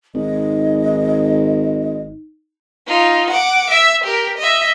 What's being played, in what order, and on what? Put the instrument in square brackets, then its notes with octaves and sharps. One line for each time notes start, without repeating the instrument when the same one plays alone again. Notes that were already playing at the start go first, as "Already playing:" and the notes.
[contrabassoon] G#1 [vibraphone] D#4 [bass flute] D#5
[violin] D#4 F4
F#5 D6
E5
G4 A#4
D#5 E5